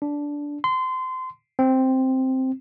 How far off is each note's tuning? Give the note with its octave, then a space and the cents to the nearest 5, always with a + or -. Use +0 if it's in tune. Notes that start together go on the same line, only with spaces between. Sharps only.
D4 -10
C6 -25
C4 +0